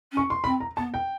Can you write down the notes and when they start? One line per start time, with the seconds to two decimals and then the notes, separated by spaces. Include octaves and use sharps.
0.12 C#4
0.17 C#6
0.30 C6
0.44 C4 B5
0.60 A#5
0.77 B3 A5
0.94 G5